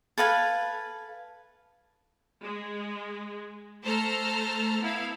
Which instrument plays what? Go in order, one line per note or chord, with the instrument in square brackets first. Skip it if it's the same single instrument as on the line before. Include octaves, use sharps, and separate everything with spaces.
[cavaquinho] A4 B4 F5 G#5
[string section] G#3
A3 A4 C5 A5 A#5 F6
B3 E4 F5